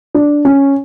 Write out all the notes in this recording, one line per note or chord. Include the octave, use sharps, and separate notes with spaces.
D4
C#4